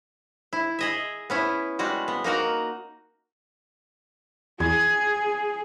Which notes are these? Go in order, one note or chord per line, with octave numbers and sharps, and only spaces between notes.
E4
G#4 D#5 E5
B3 C#4 E4
G3 G#3 F#4
B3
A#3 D#4 F#4 A#4
E2 G#4 G#6